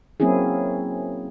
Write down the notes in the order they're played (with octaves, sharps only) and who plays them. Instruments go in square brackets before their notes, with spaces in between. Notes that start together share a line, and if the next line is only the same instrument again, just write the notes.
[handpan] F#3 A#3 C4 C#4 E4 G#4